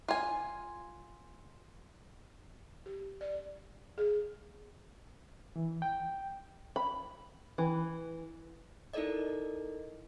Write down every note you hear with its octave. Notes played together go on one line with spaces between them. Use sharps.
F4 G#5
G4
D5
G#4
E3
G5
B5
E3
D#4 E4 A4 A#4 D5 D#5